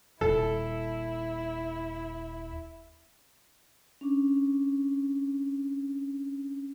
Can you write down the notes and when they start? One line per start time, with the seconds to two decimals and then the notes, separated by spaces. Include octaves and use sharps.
0.21 D#1 E4 A4
4.01 C#4 D4